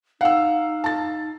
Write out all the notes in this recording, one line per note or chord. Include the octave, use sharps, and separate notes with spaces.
D#4 F5 F#5 E6
A5 A6